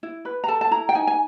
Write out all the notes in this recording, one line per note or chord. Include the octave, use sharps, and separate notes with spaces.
E4
B4
A#5
A4 A5
A5
E4 A#5
G5
D#4 G#5
G#5